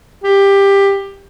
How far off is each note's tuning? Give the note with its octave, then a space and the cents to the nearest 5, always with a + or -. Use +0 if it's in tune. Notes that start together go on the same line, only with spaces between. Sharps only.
G4 +15